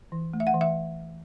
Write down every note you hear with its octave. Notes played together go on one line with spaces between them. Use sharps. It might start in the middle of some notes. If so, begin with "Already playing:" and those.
E3
A3
E5
F#5
E3
E5